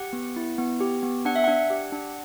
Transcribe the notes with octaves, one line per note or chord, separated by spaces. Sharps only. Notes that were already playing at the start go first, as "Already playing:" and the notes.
Already playing: G4 F#5
B3
E4
B3
G4
B3
D4 F#5
E5
D4 F#5
G4
D4